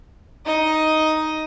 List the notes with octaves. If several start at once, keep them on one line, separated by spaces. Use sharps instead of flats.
D#4 D#5